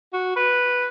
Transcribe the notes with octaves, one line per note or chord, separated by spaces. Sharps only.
F#4
B4